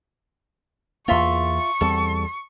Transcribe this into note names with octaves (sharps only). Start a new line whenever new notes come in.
E2 A#3 F4 E5 C6 C#6
E2 G3 C4 A4